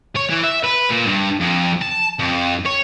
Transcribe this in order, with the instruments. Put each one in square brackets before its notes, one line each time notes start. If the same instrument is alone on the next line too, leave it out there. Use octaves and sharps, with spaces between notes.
[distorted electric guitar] C#5
E3
E5
B4
A#2
G2
F2
A5
F2
C#5